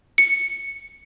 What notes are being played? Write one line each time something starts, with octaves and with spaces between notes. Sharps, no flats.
C#7